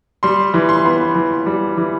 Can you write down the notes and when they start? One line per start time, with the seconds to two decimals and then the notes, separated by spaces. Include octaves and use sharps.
0.23 G3 C6
0.54 E3
0.69 C6
0.85 B3
1.15 E3
1.46 G3
1.77 E3